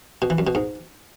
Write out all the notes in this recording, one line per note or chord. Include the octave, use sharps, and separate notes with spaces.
B2
E3
F#2
B2
G#2